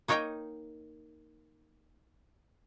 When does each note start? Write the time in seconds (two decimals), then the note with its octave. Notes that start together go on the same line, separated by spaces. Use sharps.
0.08 A#3 D#4 C#5 D#5 G5